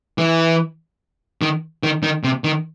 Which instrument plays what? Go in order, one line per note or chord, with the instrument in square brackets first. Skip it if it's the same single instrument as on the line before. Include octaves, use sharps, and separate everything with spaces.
[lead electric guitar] E3
D#3
D#3
D#3
C3
D#3